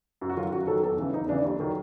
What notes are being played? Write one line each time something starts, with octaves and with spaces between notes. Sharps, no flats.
F#2
F#4
D#3 F#3 F4
F#2 F#4
D#3 F#3 A4
E2 A4
C#3 E3
E2 D#4
C#3 E3 D4
D#2
D#3 F#3